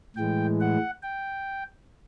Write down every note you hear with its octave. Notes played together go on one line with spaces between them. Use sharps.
A2 E3 G#3 G5
F#5
G5